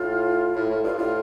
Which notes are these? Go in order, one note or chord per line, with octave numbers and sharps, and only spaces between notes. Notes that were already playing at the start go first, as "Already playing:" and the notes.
Already playing: A2 F4
A2 E4
A2 F4
G2 F4
A2 F4